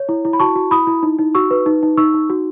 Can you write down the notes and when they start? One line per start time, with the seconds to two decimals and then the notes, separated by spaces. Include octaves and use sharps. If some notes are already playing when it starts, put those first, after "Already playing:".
Already playing: C#5
0.09 E4
0.25 E4
0.33 B5
0.40 F#4 A5 C#6
0.56 F#4
0.71 E4 B5 D#6
0.87 E4
1.03 D#4
1.19 D#4
1.35 F#4 C#6 E6
1.51 B4
1.66 D#4
1.83 D#4
1.97 D#4 C#6 E6
2.14 D#4
2.30 F#4